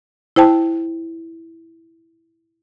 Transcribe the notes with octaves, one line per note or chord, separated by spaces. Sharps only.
E4 C5 G5 A5